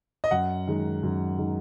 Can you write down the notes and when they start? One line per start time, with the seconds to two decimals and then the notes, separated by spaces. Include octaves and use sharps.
0.24 D#5
0.31 F#2 F#5
0.67 D#3 G#3
1.03 F#2
1.38 D#3 G#3